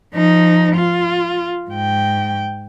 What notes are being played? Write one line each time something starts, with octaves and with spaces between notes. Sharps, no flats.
F3 D#4
F4
G#2 G5